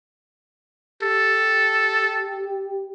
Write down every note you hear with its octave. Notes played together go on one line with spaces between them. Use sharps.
G4 A4